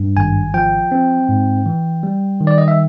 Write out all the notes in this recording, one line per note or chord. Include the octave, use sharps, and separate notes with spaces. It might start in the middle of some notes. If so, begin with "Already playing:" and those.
Already playing: G2
G#1 G#5
F3 G5
C4
G#2
E3
G3
D#3
D5
D#5
E5